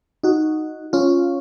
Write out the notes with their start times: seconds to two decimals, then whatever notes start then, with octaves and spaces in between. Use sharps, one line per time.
0.23 D#4 F#4
0.93 C#4 F4